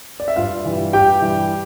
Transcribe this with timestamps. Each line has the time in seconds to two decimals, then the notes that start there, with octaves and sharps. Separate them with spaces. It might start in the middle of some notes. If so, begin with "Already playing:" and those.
0.20 D5
0.28 E5
0.36 G2 F4 F5
0.65 E3 G3
0.93 G2 G4 G5
1.22 E3 G3